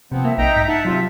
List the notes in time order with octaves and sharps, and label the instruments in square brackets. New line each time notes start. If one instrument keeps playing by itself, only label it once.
[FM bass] C3 [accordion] F3 B3 C4
[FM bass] A#3 [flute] E5
[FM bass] B1 [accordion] D#4 G5 A#5
[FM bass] G#2 [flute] B6
[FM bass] D#4 [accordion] E5 F#5 A5
[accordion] C3 C4 F4 [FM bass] F#3